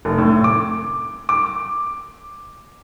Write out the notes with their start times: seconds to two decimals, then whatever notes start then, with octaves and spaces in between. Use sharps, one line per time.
0.05 F1
0.18 A2
0.44 D6
1.29 D6